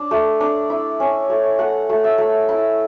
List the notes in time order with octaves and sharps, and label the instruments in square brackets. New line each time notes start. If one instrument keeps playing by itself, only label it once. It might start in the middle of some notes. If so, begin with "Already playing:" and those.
Already playing: [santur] D4
A3
D4
E4
C#4
A3
A3 F#5
A3
E5
A3
E4